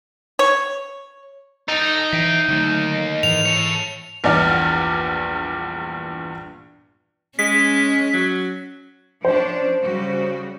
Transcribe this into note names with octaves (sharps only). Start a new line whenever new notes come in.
C#5
D#4 A4 G5
E3 E5 G5
D#2 D3 D#3 F#3 A3
G#2 E3 F7
A4 C#5
A#1 E2 G2 D5 F#5 F6
G#3 C#4 B6
F#3
F3 C#4 D4 C5
C#3 G3 F#4